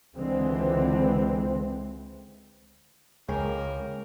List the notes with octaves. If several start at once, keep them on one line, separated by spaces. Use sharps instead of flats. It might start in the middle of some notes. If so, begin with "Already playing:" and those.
C#2 D3 E3 G#3 C4
C#2 A#3 G#4 A#4 C#5 G5